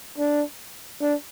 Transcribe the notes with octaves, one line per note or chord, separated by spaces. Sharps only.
D4
D4